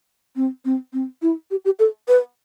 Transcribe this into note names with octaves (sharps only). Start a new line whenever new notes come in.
C4
C4
C4
E4
G4
G4
A4
B4